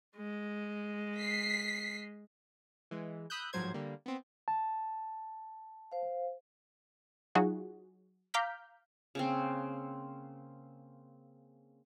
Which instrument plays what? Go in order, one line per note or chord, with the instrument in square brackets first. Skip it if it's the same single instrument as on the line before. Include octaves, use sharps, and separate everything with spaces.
[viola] G#3
[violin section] B6 C7
[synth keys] E3 G#3
B5 D#6 E6 F#6 G6
A1 G#2 F3 F#3 C5 G#6
D3 G3 A#3
B3 C4
[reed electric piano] A5
[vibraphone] C5 F5
[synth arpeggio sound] F#3 D#4 F4 F#4 G#4
F5 A#5 D6 F6 G6 B6
[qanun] C#3 A#3 C4